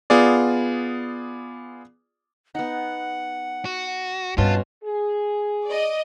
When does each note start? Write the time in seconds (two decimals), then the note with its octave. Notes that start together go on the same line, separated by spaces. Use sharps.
0.10 B3 F4 G#4 D5
2.55 B3 D#4 F#5
3.65 F#4
4.38 G2 B2 C#4 F4 A5 C6
4.84 G#4
5.67 D5 D#5